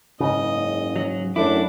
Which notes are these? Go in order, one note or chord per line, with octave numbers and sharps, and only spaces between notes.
F#1 G#2 C#3 D#5
F#3
F#2 A3 D4 E4 D6